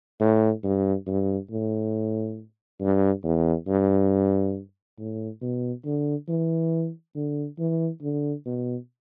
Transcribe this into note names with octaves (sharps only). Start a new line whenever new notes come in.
A2
G2
G2
A2
G2
E2
G2
A2
B2
D3
E3
D3
E3
D3
B2